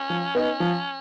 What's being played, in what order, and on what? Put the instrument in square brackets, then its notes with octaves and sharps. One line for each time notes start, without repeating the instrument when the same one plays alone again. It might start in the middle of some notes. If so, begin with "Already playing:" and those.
Already playing: [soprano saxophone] C#4
[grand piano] F3
B3 D#4
F3